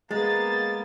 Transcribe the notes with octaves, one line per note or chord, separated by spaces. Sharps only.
G#3 A#3 B3 A6